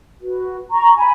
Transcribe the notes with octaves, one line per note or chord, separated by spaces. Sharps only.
F#4 B4
A#5 C#6
G#5 B5